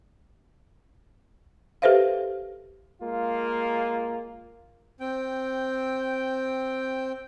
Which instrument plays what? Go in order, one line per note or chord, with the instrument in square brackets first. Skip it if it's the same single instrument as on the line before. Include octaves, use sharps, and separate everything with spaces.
[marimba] G4 A4 B4 C5 E5 F5
[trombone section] G#3 A#3 F4
[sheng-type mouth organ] C4 G5